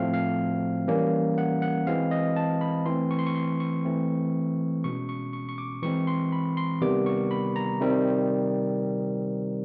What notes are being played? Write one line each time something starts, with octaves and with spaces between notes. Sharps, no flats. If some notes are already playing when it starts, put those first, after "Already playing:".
Already playing: A2 F3 A3 C4 F5
F5
E3 G3 A#3 C#4
F#5
F#5
E3 G#3 C4 F5
D#5
A5
B5
E3 A3 C4 C6
C#6
C6
C#6
C6
C#6
E3 A3 C4
B2 G#3 C#4 C#6
C#6
C#6
C#6
D6
E3 G#3 C4 C#6
C6
B5
C6
C3 D#3 G3 B3 D6
C#6
B5
A#5
C3 D#3 G3 C4